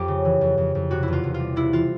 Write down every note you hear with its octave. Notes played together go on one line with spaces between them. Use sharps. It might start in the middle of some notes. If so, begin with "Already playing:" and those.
Already playing: F2 G4
C#3
E3
F2
F2
F2
C3 F#4
E4
E2 F4
E2
F4
G3
C3 E4
E3 F4